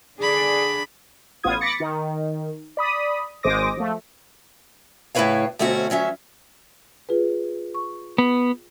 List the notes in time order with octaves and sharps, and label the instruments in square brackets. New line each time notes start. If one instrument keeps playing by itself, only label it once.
[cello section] D3 G#4 D5 [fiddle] D4 B5
[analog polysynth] A1 B3 F4 D#6 G#6
B5 D6 A6 A#6 C#7
D#3
D5 B5 D#6
G#1 G#3 C5 D6 D#6 A#6
F3 A3
[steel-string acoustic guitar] A2 C#3 E4 B4 C#5 F5
D2 B2 A3 C4 C#4 F#4
D2 F#3 C#4 E5
[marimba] F4 G#4 B4
C#6
[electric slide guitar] B3